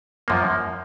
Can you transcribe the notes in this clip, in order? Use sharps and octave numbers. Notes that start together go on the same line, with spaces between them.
F#2 F3 A#3